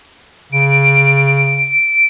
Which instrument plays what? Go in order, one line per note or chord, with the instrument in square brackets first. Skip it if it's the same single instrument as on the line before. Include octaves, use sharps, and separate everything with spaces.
[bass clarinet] C#3 [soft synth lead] D7